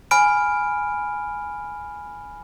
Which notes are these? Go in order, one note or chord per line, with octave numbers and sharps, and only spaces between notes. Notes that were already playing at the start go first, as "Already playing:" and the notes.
G#5 B5 F6 D7